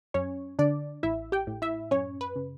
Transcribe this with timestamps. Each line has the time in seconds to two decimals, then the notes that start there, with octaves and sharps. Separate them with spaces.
0.14 F#2 C#4 C#5
0.59 D3 D4 D5
1.03 A1 E4 E5
1.32 G4 G5
1.47 A2
1.62 E4 E5
1.91 F#2 C#4 C#5
2.21 B4
2.36 C#3